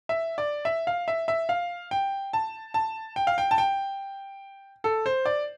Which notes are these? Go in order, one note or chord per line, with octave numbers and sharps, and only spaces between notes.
E5
D5
E5
F5
E5
E5
F5
G5
A5
A5
G5
F5
G5
A5
G5
A4
C5
D5